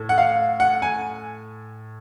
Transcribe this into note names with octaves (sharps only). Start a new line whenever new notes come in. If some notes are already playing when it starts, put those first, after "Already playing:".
Already playing: A2
F#5
F5
F#5
G#5